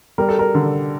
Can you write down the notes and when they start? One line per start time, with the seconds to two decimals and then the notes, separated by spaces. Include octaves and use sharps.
0.18 G3 A#4
0.29 A4
0.39 A#4
0.55 D3